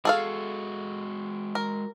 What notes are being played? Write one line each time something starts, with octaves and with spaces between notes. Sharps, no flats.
G#3 F#4 G#4 A4 F5
A#4